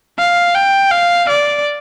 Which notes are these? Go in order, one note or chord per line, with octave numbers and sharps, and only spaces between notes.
F5
G5
F5
D5